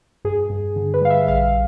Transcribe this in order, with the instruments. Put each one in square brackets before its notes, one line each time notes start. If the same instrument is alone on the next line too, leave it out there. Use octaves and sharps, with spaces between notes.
[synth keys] G2 G#4
G2
D3
B4
G3 F5
E5
A#1 F5